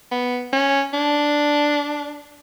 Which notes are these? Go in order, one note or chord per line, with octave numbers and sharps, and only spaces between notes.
B3
C#4
D4